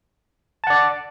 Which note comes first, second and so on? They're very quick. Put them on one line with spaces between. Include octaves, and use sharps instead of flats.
A5 F#5 D5